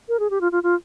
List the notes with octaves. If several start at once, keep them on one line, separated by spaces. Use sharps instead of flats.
A#4
G#4
G4
F4
F4
F4